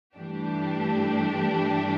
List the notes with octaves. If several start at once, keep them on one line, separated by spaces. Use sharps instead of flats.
G2 E3 A3 D4 G4